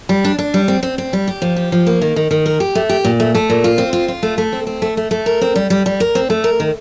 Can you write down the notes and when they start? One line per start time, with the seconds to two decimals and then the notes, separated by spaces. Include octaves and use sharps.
0.09 G3
0.24 D4
0.38 D4
0.54 G3
0.68 C4
0.83 C4
0.98 C4
1.13 G3
1.27 G4
1.42 F3
1.56 G4
1.72 F3
1.87 A#3
2.02 D#3
2.16 D#3
2.31 D#3
2.46 A#4
2.60 G4
2.75 A3
2.89 G4
3.04 A#2
3.20 A3
3.35 A3
3.49 A#2
3.64 F4
3.78 C4
3.93 F4
4.08 F4
4.23 A3
4.38 A3
4.53 C4
4.67 C4
4.82 A3
4.97 A3
5.11 A3
5.26 A#4
5.41 C4
5.56 G3
5.70 G3
5.86 G3
6.00 A#4
6.15 C4
6.30 A3
6.44 A#4
6.60 D#3